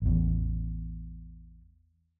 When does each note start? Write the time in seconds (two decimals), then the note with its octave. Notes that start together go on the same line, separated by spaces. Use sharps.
0.02 A1 E2